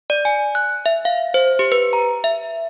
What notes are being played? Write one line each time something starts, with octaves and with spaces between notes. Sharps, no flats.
D5
G#5
F#6
E5
F5
C5
G4
B4
A#5
E5